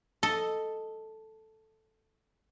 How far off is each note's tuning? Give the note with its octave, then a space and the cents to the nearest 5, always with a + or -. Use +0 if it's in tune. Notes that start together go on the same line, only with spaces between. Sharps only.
A4 +0 D#5 +0